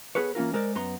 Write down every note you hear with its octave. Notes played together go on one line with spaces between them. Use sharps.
B3 G#4 A4 B4 C#5
E3 A#3 C#4 F4 A#4
G#3 A#4 C5 D5
F#2 B3 A#5 C6